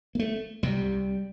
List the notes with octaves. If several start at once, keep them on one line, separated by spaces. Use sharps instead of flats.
A#3
A3
C2 C3 G3